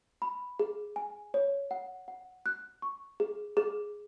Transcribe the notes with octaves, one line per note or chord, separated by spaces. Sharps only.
B5
G#4
G#5
C#5
F#5
F#5
F#6
C#6
G#4
G#4